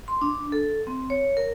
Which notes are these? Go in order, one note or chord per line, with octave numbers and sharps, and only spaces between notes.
C6
D4
A4
C4
C#5
A#4